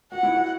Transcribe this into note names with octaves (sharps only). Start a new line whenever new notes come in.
F#4 F#5
E4
F#4